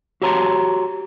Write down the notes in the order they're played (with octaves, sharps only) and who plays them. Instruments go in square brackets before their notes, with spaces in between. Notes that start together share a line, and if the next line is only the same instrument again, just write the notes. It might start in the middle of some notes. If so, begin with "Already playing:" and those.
[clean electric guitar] F#4 G4 C#5 A5 A#5 C6